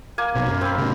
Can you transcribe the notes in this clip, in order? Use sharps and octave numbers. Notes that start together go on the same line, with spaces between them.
A#3 G#5
A#1 B2
F#2 F#3
C4 B5
A2 C#3